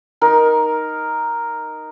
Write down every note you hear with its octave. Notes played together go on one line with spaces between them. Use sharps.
D#4 A#4